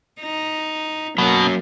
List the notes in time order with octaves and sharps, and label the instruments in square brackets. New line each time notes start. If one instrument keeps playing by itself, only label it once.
[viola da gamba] D#4
[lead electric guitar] B2 [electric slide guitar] F#3 C#4 [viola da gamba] A#3